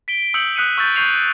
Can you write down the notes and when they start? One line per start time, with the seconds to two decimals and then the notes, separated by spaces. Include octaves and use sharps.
0.08 B6 D7 G7
0.34 D#6 E6 G6 C#7 F#7
0.56 D#6 F#6 B6 C#7 D#7
0.78 C#6 E6 G6 A6
0.96 C#6 G6 C7 D#7 F7